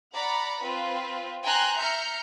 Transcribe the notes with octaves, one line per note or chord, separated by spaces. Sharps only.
D5 F#5 A#5 B5
C4 F4 B4
G5 G#5 A#5 C6 F#6
E5 A#5 F6 G6 C#7